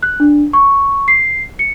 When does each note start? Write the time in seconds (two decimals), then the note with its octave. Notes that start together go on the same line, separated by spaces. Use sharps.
0.03 F#6
0.20 D4
0.53 C#6
1.08 C7
1.59 C#7